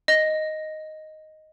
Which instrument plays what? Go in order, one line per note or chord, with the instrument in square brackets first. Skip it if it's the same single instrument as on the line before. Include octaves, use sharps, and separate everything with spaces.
[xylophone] D#5